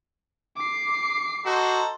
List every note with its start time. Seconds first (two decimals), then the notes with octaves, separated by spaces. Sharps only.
0.56 D6 C7
1.46 D#4 F#4 A4 C5